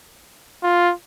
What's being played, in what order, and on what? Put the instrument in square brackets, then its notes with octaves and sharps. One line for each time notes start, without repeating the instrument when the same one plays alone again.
[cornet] F4